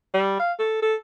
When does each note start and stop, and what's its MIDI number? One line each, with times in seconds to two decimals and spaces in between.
0.14 0.37 55
0.39 0.52 77
0.59 0.78 69
0.82 0.96 69